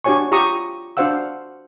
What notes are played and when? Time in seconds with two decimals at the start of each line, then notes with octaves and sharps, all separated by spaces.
0.04 D4 F#4 G4 C#5 G#5 C#6
0.32 F4 G4 A#5 C#6 D#6
0.97 D4 F#4 C5 F5 F#5 E6